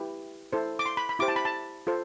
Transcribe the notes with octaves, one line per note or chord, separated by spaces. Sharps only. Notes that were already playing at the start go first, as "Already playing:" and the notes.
Already playing: E4 G4 B4
E4 A4 C5
D6
C6
B5
B5
E4 G4 C5 D6
A5
B5
A5
F4 A4 C5